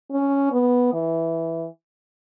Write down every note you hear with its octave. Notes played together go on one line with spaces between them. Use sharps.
C#4
B3
E3